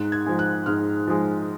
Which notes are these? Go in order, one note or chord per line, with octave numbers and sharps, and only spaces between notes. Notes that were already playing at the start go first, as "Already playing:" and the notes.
Already playing: G#2 F#6
G#6
F3 G#3
F#6
G#2 F6
F3 G#3